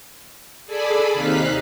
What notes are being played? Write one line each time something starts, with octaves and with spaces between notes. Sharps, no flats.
G#4 A4 D5 G#5 B5
D#2 C3 D#4 F5 F#6 B6